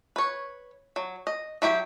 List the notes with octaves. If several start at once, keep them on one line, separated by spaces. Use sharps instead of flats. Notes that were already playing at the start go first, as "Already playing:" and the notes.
B4 C#5
F#3
D#5
F#3 E4 G4 G5